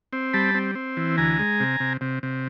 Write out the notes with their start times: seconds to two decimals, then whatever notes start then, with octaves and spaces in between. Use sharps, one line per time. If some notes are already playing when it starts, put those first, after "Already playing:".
0.13 C4
0.33 G3 A5 B5
0.55 C4
0.75 C4
0.97 E3
1.18 D2 G#5 A#5
1.39 G#3
1.60 C3
1.80 C3
2.01 C3
2.23 C3